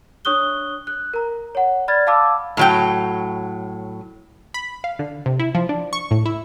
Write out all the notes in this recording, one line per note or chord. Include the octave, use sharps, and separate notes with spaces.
D4 C#5 C#6 D#6 F#6 G7
F#6
A#4 A#5
C#5 F#5
D5 B5 F6 G#6 A6
F5 A5 B5 D6 E6
A2 F#3 G5
B5
F5
D3
C3
E4
F3
D4
C#6
A2
E4